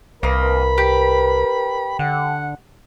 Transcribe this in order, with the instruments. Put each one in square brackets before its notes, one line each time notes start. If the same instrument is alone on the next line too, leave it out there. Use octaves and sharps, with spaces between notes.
[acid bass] C2 [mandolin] A#3 D#5 [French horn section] A#4 B4 [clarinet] B5
[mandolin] G4
[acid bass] D3 [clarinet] F#5